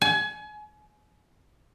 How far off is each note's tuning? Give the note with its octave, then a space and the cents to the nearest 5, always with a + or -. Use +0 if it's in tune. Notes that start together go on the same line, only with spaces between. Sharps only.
G#5 +30